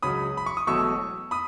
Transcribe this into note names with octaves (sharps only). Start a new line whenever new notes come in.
C#2 C#3 F#3 C#4 B5 D#6
B5
C#6
D#6
E1 E2 B2 F#3 A3 C#6 E6
B5 D#6